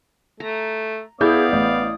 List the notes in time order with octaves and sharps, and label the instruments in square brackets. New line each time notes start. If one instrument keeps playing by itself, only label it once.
[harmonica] A3 [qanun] A#5
[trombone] B3 [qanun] E4 [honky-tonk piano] G#4 G6 [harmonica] D5 F5 D#6
[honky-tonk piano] A1